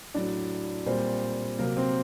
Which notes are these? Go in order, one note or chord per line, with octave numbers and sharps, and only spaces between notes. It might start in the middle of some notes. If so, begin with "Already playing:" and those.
A2 F#3 D4 D5
A#2 G3 C4 C5
C3 F#3 A#3 A#4
C4 C5